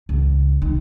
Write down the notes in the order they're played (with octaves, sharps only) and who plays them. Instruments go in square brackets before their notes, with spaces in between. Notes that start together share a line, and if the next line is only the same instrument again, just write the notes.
[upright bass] C#2
D#3